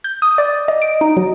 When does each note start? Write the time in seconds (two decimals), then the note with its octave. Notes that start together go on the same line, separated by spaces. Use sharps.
0.04 G6
0.22 D#6
0.38 D5
0.68 D#5
0.82 D7
1.01 D#4
1.17 F#3